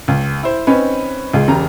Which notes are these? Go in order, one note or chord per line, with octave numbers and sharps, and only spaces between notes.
C#2
E4 C5
C4 C#4 D#4 B4
C#2 G#3
E1 C#3 G4 A#5